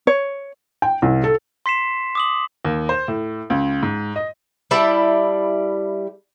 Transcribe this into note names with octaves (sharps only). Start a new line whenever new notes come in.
C#5
G5
C2
A4
C6 B6 C7 E7
D6 D#6 F#7
D#2
C5
A2
C#2
G#2
D#5
G3 E4 D5 A5